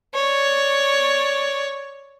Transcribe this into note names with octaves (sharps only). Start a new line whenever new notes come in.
C#5 D5